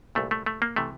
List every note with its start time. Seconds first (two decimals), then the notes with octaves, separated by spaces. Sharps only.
0.15 C2 A#2 A3
0.31 A3
0.46 A3
0.62 A#3
0.76 C3 E3 A3